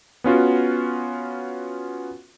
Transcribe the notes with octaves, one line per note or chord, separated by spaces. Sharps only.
B3 C#4 F4 F#4